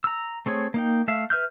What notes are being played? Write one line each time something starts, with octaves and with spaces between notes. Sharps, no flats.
A#5 E6
A3 C4 G#4 C#5
A#3 D#4 G5
A3 E5 F5
B4 E5 F6 G6